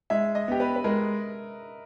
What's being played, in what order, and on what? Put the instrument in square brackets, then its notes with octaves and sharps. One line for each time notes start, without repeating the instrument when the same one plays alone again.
[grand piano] G#3 [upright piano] E5
[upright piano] D#5
[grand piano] B3 G4
[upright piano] B4
B4
[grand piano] G#3 [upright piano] A#4